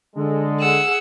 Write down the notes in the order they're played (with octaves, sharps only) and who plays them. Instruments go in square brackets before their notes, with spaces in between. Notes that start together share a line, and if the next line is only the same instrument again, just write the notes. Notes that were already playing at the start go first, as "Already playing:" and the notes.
[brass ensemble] D3 G#3 A4
[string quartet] G#4 F#5 E6